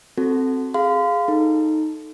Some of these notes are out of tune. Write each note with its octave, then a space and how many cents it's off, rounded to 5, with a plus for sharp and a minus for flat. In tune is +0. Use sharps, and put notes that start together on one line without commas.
C4 +0 F#4 +0 A4 +0
G#4 +0 F5 +0 C6 -40
D#4 +0 A4 +0 A#5 +0